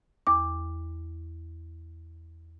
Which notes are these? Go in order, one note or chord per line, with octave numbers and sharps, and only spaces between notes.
E2 D6